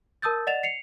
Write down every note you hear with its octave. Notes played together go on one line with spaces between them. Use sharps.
A#4 A5 D#6 E6 G6 A6
D5 D#5 F#5 A6 E7 F7
C7 C#7 F7